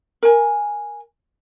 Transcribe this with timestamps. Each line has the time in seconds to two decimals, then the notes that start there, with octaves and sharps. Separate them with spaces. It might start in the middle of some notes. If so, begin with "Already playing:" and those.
0.23 A#4 G#5